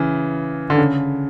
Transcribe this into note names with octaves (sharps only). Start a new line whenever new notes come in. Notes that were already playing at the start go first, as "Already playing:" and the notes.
Already playing: C#3 E3
D3
C#3